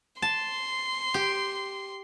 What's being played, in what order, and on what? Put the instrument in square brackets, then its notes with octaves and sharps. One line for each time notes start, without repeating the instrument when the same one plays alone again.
[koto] A5 [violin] C6
[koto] G4